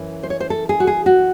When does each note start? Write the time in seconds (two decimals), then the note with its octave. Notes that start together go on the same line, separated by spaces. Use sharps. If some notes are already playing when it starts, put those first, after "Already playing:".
Already playing: F#2 E3
0.23 C5
0.30 C#5
0.40 C5
0.50 A4
0.69 G#4
0.80 F#4
0.87 G#4
1.06 F#4